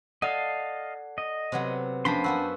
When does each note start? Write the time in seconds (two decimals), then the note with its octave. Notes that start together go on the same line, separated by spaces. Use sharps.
0.22 A4 D5 D#5 F5 F#5 A5
1.18 D#5
1.52 C3 F#3 B3
2.05 F2 A#3 C#4 D4 C5 A5 B5 C6
2.24 F#2 B3 F#4 E6